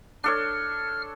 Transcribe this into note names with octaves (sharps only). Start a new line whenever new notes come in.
D4 A4 C#5 F6